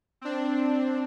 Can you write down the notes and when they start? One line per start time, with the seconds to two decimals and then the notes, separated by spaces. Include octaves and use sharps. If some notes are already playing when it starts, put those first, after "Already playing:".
0.21 C4 D4